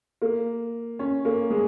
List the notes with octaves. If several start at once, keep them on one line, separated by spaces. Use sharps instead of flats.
A#3
C#4
A#3
G#3